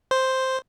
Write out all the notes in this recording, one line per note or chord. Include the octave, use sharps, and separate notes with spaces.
C5